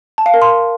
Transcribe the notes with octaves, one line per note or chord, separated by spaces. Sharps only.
A5
F5
A#4
C6